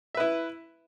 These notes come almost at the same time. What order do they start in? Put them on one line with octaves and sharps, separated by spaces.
E5 B4 E4